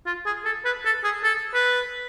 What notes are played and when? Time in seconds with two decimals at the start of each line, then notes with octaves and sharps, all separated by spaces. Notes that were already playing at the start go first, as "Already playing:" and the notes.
0.06 F4
0.26 G#4
0.45 A4
0.65 B4
0.85 A4
1.04 G#4
1.24 A4
1.54 B4